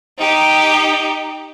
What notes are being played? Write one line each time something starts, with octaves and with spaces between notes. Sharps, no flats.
D#4 G4